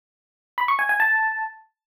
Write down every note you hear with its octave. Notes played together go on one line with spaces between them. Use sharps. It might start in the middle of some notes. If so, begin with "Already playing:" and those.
B5
C#6
G#5
G#5
A5